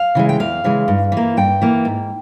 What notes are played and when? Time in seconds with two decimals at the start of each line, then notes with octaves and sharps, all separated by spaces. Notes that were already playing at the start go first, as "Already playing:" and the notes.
Already playing: F5
0.15 C#3 E3 G#3
0.29 G5
0.40 E2 F5
0.64 C#3 E3 G#3
0.88 G2
1.12 E3 A#3
1.37 G2 G5
1.62 E3 A#3
1.85 G#2